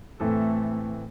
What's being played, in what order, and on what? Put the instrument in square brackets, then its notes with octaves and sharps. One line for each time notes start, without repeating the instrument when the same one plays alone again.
[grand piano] A2 E3 C4 A4 [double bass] A3